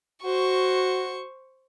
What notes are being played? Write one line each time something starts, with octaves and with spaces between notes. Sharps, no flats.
F#4 C5 C#6